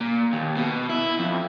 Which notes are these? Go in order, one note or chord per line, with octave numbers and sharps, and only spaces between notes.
A#2
D#2
B2
E4
F2